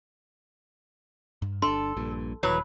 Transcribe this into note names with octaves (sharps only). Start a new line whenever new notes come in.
G2
G1 D4 A4 C6
A#1 G2 A#2
D#1 E3 F#3 B4